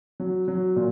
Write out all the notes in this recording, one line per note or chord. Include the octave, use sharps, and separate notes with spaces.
F#3
F#3
A#2